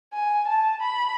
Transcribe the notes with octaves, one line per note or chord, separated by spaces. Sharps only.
G#5
A5
B5